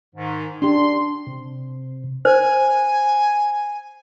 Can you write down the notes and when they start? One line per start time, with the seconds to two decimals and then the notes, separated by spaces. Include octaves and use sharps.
0.15 G#2 D#3
0.62 D4 G4 C6
1.27 C3
2.25 C5 G#5